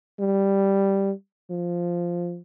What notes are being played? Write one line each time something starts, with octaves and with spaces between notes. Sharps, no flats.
G3
F3